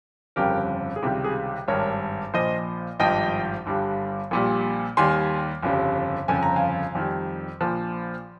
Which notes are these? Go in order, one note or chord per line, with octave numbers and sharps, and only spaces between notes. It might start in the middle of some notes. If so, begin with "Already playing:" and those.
G1 F2 C#3 G3 G4 A#4
G#4
C#2 C3 D#3 G3 G4
G#4
G#1 G2 G3 A#4 C#5
A#1 A#2 F3 C5 D#5
G#1 G2 F3 D#5 G5
G1 G2 G3
A#1 A#2 G3
D#2 D#3 G3 G#5 C6
G1 F2 C#3 G3
G1 F2 C#3 F3 G#5
A#5
F5 G#5
F2 D#3 G3
A#1 A#2 F3